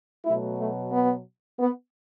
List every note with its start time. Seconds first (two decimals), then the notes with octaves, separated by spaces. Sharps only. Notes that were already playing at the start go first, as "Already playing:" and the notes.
0.25 B2 F#3 A3 E4
0.60 A3
0.92 B3
1.59 B3